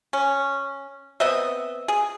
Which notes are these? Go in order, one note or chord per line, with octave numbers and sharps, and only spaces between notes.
C#4
B3 C4 D#5 E5
G#4